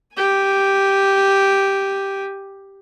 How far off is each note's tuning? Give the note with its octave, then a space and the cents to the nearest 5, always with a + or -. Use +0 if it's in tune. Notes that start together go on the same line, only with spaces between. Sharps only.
G4 +0 G#5 +0